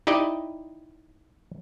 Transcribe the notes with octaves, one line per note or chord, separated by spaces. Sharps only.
D#4 E4 G4 D5 D#5